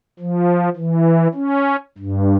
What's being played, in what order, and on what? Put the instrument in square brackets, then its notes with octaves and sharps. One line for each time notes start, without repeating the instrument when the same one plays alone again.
[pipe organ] F3
E3
C#4
G2